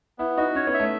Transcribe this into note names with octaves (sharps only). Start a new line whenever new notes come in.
B3 E4
D#4 F#4
C#4 C#5
B3
E5
A3